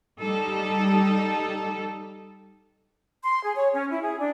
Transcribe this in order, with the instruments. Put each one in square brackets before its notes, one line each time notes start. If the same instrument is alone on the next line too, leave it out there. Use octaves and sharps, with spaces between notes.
[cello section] G3 D#4 A4
[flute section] C6
G#4
C#5
C#4
E4
G#4
D4